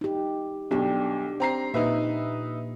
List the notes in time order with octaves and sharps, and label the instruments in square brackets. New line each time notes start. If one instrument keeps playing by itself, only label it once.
[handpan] D#4 G4
[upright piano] B1 [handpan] D4 G4
[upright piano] C4 A#5 C7
[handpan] A#2 [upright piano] D#4 B4 E5